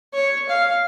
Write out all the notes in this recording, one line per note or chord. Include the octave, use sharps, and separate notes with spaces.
C#5
F5